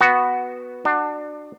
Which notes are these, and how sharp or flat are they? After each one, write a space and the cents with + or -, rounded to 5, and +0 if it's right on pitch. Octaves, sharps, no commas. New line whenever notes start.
B3 +0 F#4 +0
D4 +25 F#4 +0